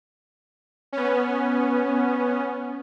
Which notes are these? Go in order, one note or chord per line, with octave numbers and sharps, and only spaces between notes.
B3 C#4